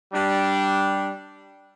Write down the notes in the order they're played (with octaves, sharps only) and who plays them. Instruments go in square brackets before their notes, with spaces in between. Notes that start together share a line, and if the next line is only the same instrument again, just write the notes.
[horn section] G3 D4